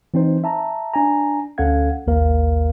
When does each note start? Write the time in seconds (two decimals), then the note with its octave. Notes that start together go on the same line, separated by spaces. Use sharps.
0.14 E3 C4 D#4 C5
0.44 E5 A5 A#5
0.94 D4 G#5 A#5
1.58 D2 C#4 A4 F5 F#5 G#6
2.07 A1 D#2 A#3 A#4 F5